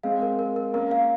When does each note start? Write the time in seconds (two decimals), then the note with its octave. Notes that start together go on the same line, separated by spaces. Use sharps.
0.03 G#3 C4 F5
0.22 A#4
0.39 A#4
0.56 A#4
0.73 A#3 C#4 A#4
0.91 F5